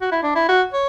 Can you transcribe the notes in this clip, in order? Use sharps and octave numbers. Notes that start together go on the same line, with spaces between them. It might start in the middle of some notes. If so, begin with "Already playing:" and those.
F#4
E4
D4
E4
F#4
C#5